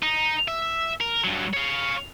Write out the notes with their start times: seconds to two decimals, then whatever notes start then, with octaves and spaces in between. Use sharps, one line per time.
0.03 D#4
0.48 E5
1.00 A#4
1.24 G2 F#3
1.54 C#5 F5